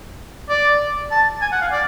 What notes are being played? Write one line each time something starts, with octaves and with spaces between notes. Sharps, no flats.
D5
A5
G#5
F#5
F5
D5